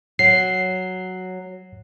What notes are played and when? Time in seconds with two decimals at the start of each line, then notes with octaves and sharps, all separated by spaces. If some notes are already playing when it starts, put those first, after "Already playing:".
0.19 F#3 C7